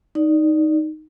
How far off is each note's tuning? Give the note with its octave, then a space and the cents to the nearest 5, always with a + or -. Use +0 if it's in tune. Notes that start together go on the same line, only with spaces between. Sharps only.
D#4 +0 D5 +0